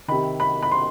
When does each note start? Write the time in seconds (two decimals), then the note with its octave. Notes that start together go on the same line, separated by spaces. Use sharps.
0.08 C3 D#3 B5
0.40 B5
0.63 B5
0.72 C6